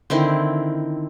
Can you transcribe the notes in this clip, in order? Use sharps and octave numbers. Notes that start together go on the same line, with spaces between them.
D3 D#3 C4 E4